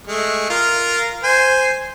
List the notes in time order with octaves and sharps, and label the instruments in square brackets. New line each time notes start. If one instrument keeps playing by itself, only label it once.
[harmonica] G#3 A3
F4 A#4
C5 G#5